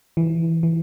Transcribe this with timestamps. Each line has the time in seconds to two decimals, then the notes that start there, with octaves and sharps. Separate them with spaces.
0.17 E3
0.63 E3